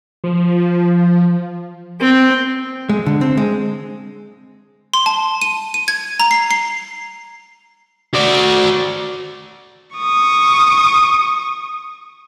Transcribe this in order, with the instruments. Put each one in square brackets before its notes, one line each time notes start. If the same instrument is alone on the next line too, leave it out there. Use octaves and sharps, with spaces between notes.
[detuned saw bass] F3
[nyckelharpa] C4
[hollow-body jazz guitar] G#3
D3
C4
G#3
[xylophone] C6
A5
D#7
D#7
G#6
A#5
C7
C7
[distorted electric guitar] F#4 D5
[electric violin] C#6 D#6